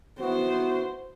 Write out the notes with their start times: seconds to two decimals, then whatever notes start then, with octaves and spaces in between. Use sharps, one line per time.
0.21 B3 E4 F#4 C5